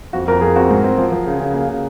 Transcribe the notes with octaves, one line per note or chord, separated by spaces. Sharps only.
F2 F#4
F2 A#4
F2 G#4
C4 F#4
G#2
C4
F3
F3
C#3
C#3
A#3
C#3